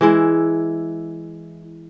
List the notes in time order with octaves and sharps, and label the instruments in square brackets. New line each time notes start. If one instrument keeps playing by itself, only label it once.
[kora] E3 G#3 E4